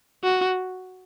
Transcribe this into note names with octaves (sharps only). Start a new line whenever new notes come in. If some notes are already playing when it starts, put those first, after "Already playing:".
F#4